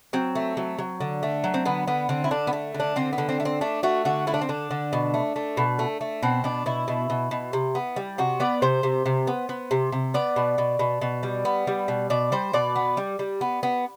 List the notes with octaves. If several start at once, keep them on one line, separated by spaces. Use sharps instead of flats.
F#3 C4
A3
F#3
F#3
D3
A3
F#3
C4
D3 B3
D3 B3
D3 C4
E4
D3 D4
B3
A3
D3
D4
D3 C4
B3
D3
C4
A3
C4
A3 D4
A3 F#4
D3 F#4
A3 E4
D4
C4
D3 D4
D3
B2
A3
A3
B2
A3
A3
B2 C4
B2 D4
B2 E4
B2
B2
B2
C3
B3
G3
C3 F#4
B3 D5
C3 C5
C3
C3
B3
B3
C3
C3
B3 D5
B2
B2
B2
B2
G3
B3
G3
B2
B2 D5
G3 C5
B2 D5
B3
G3
G3
B3
B3